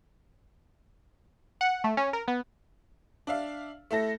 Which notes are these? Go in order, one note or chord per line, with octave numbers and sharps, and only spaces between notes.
F#5
A3
C#4
A#4
B3
D4 E5 F5
A3 E4 A4 A#6